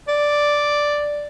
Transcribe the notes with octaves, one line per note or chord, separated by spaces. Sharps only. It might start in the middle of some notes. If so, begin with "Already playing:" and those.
D5